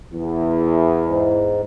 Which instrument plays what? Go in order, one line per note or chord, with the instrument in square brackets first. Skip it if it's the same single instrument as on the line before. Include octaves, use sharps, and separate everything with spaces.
[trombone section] E2
[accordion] G#2